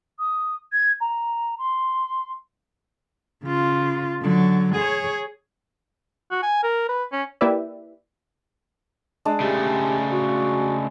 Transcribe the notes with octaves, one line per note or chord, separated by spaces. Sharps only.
D#6
G#6
A#5
C6
C#3 F4
D3 F#3
G#4 C#5
F#4
G#5
A#4
B4
C#4
A#3 E4 G4 B4 D5 E5
G#3 D4
C#3 A3 G4
F#4